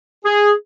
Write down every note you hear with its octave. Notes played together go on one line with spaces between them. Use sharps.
G#4